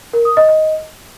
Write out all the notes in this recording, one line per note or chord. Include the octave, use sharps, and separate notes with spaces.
A#4
D#6
D#5
D#5